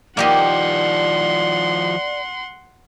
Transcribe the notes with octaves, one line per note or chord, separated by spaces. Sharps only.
D#3 F3 A#3 G4 D5 D#5 F#5 C6